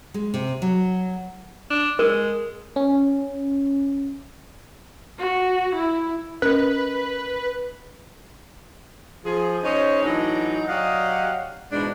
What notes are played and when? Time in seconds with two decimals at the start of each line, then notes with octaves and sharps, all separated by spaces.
0.14 G#3
0.34 C3
0.62 F#3
1.70 D4
1.99 G#3 A#4
2.76 C#4
5.19 F#4
5.76 E4
6.42 C#4 A#4 B4 D#5 F#6
9.25 F3 G#4
9.63 C#4 D#4 G#4 C5 C#5 D#5
10.03 A2 E3 F#3 D4 D#4
10.68 F#3 G4 D5 D#5 F5 F#5
11.71 G#2 B2 E3 G#3 D4